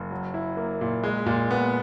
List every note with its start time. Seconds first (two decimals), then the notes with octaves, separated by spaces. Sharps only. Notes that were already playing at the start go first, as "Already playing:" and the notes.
Already playing: F#1
0.11 F#3
0.34 E4
0.57 A#3
0.81 A#2
1.03 G#3
1.26 A#2
1.51 B3